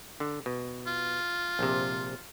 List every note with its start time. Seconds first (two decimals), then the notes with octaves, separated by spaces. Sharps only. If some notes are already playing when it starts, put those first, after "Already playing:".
0.20 D3
0.46 B2
0.87 F4
1.59 A#1 C3